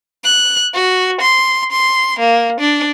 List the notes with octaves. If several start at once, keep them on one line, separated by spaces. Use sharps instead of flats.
F#6
F#4
C6
C6
A#3
D4